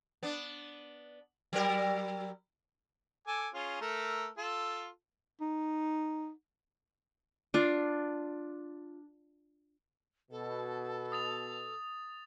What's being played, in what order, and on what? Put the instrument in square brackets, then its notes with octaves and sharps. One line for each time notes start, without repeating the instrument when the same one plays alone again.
[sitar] B3 D4
F#3 G3 A#4
[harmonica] A4 G#5 D6
C#4 F4 G#4
A3 A4 A#4
F4 A4
[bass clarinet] D#4
[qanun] D4 F4
[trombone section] B2 [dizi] A4
[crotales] D#6 A6 F7